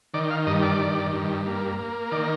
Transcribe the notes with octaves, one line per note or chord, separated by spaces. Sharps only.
D#3 D5
F5
G2 D#5
D5
D#3
G2
A#3
A#3
D#3 D5